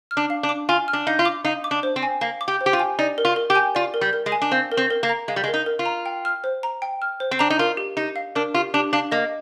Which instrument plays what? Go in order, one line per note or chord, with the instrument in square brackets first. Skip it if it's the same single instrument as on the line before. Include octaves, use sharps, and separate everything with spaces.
[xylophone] F6
[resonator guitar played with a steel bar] D4
[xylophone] F5
[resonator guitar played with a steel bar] D4
[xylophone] D6
[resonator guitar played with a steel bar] F4 [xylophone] G#5
[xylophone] F6
[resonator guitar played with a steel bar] D4
[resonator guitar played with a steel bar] D#4 [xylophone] F5
[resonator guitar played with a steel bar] F4
[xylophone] D6
[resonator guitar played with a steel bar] D#4 [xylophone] F5
[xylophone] D6
[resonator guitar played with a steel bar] D4
[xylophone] C5
[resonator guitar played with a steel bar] C4
[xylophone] G#5
[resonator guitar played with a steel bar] A#3 [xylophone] F5
[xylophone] D6
[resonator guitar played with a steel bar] G4
[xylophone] C5
[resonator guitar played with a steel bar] G4
F4
[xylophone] G#5
[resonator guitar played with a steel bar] D#4 [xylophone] D5
[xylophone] A#4
[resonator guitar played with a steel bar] F4
[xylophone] A#4
[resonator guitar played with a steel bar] G4
[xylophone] G#5
[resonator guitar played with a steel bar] F4 [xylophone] D5
[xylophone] A#4
[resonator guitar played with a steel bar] G3
[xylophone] A#4
[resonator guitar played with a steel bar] G#3
[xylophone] G#5
[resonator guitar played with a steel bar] D4
[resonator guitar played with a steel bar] C4 [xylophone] F5
[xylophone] A#4
[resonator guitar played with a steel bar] C4
[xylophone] A#4
[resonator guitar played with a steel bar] A#3
[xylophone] A#5
[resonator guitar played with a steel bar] G#3 [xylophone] F5
[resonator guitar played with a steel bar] G3
G#3
[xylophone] A#4
[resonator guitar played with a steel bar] D#4
[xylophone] A#4
[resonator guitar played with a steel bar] F4
[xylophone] A#5
G5
F6
C5
A#5
G5
F6
C5
[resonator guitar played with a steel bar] C4
[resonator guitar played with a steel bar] D4 [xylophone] A#5
[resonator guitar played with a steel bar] D#4
[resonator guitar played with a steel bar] F4 [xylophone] A#4
[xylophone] G4
[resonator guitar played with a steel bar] D#4 [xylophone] G4
[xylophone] F5
[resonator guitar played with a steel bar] D4 [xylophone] A#4
[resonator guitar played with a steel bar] F4 [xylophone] G4
[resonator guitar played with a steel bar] D4 [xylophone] G4
[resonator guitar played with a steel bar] D4 [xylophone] F5
[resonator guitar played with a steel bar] A#3 [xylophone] D#5